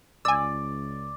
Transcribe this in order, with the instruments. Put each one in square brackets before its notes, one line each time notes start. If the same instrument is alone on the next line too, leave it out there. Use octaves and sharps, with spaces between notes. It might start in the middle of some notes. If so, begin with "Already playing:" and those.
[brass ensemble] C#2 [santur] D5 [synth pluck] G#5 E6